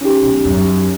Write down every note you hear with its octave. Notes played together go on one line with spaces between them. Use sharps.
C#4 D#4 G4
B1
F#2